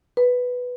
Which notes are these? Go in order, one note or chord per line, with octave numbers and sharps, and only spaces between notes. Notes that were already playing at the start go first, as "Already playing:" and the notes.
B4